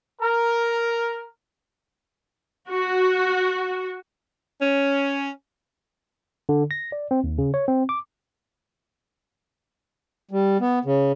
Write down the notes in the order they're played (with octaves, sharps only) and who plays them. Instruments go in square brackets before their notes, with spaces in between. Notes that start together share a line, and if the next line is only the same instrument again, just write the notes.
[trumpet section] A#4
[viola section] F#4
[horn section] C#4
[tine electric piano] D3
A#6
D5
C4
D#2
C#3
C#5
C4
D6
[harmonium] G3
B3
C#3